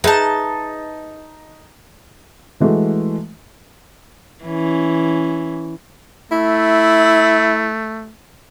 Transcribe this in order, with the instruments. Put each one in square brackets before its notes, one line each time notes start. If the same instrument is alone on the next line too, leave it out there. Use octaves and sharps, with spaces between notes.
[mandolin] D#4 A5 [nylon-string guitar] G#4 B4 E5
[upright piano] E3 G#3 A3 F#4
[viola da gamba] E3 C#4
[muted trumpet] A3 [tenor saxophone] E4